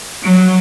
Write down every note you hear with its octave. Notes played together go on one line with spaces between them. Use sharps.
F#3